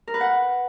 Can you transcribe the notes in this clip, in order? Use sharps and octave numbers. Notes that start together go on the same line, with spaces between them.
A#4
B4
F#5